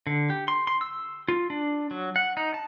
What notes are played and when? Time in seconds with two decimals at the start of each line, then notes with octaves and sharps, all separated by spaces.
0.07 D3
0.30 G4
0.48 C6
0.67 C6
0.81 E6
1.28 F4
1.50 D4
1.91 F#3
2.16 F#5
2.37 D#4
2.54 A5